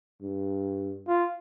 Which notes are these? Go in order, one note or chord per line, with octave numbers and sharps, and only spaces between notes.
G2
F4